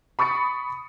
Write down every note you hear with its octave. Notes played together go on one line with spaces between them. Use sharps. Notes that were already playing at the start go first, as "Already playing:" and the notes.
B5 C#6 D#6 A6 C#7